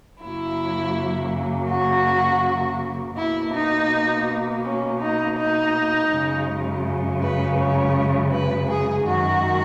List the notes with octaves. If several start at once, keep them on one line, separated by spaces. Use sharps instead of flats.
F#2 C#3 F#3 A#3 E4
F#4
B2 A#3 E4
D#4
C#4
D#4
D#4
F#2 C#3 G#3
B4
C#5
B4
G#4
F#2 D#3 G#3 F#4